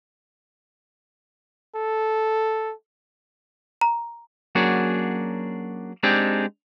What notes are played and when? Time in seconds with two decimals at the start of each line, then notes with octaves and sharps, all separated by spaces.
1.75 A4
3.81 A#5
4.55 F#3 A#3 C#4 D4 F#4 G#4
6.03 G#3 C4 D4 D#4 G4 G#4